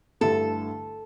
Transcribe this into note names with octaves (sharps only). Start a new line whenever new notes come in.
G2 D3 A3 E4 A4